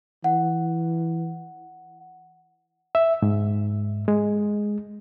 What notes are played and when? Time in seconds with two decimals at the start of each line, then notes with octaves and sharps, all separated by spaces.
0.24 E3 F#5
2.95 E5
3.22 G#2
4.08 G#3